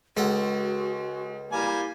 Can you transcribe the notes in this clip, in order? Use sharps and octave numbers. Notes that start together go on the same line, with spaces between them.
C#2 G#3 F#4 A4 F#5
G3 A#3 E4 G#5